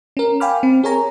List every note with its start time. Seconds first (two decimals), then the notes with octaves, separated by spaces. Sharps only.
0.17 C#4 A#4
0.40 F5 G5 G#5 B5 D6 F6
0.63 C4
0.83 G#4 A#4 C#5 G#5 A#5